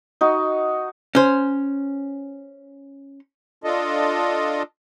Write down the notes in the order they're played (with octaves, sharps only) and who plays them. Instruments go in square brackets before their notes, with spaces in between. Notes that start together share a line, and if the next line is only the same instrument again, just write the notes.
[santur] D#4 F#4
[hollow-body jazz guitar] C#4 C5
[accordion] D4 F4 A4 D#5